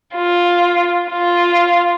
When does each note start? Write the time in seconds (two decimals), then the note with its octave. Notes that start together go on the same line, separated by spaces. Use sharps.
0.15 F4
1.10 F4